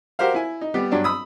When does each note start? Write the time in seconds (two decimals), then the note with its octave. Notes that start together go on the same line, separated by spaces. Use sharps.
0.19 F#4 G4 A#4 C5 F5
0.34 E4 G#5
0.61 D#4
0.74 G3 B3 G4
0.91 G2 F#3 D4 D5
1.04 B5 D#6 E6